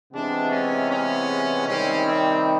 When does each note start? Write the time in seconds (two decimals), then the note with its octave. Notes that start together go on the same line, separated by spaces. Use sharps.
0.13 C3 E3 G#3 B3 D4
0.51 C#4
0.90 C#4
1.67 C3 D#3 G3 C4 C#4
2.06 C4